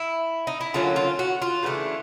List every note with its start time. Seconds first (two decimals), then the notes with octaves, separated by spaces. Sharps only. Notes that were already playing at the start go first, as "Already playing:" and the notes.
Already playing: E4
0.47 D#4
0.61 E4
0.74 D3 F#3 A#3 C#4 F4
0.96 F4
1.19 F#4
1.42 F4
1.63 C#3 E3 A3 D4